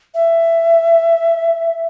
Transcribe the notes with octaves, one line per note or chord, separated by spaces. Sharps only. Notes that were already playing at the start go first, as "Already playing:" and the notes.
E5